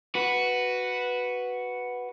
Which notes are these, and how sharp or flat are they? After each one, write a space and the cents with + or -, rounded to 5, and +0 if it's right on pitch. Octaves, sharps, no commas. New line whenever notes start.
F#4 +0 B4 +0